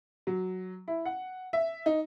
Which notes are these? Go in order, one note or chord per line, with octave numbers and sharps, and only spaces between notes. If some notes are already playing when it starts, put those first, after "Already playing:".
F#3
E4
F#5
E5
D#4